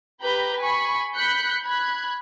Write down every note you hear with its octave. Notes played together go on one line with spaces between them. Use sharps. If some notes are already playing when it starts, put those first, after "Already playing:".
G4 B4 A#5 B5 G6
G#5 B5 C#6
B5 F#6 G6 B6 C#7
B5 F#6 G#6